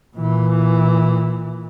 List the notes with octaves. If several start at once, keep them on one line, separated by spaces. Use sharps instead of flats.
A#2 E3